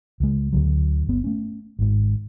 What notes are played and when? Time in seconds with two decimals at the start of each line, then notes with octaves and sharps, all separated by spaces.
0.20 C#2 G#3
0.53 D2 D3 F#3
1.07 G1 B3
1.24 A3 C#4
1.79 G#1 G#2